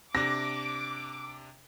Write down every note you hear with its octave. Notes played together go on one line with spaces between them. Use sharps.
C3 D4 D6 A#6